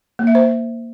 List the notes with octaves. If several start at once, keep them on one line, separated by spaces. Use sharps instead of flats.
A#3
E5
C5